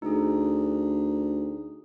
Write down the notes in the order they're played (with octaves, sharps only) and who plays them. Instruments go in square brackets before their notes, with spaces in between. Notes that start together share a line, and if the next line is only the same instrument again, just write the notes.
[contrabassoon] D2 [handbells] D#4 G#4